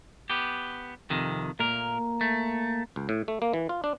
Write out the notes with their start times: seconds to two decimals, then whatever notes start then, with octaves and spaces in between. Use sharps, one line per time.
0.30 B3 G4
1.10 F2 C3 D#3
1.59 A#2 A#3 A#4
2.21 A3
2.96 C#2
3.09 A2
3.28 A3
3.42 A#3
3.53 E3
3.69 F4
3.84 D4